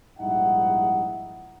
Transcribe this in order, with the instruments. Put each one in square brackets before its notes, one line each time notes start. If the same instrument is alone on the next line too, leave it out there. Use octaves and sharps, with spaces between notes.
[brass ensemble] A#1 G#2 G3 D#4 E4 F#5